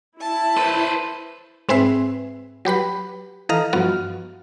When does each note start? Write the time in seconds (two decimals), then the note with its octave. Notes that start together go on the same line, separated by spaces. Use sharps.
0.21 E4 A5
0.57 B4 C5
1.69 G#2 C4 G#4 B4 E5 C7
2.65 F#3 G4 B4 B5
3.49 E3 A4 D#5 F5 A#5 F6
3.73 G2 F3 B3 F#4 F6